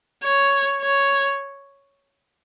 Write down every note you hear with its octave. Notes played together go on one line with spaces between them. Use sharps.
C#5
C#5